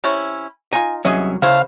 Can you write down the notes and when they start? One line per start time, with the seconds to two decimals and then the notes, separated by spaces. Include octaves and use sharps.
0.04 C3 C#4 E4
0.73 D#4 F4 G#5
1.05 C2 F#3 C#4 G#4 D#5 E5
1.42 C#3 A3 E4 C5 F5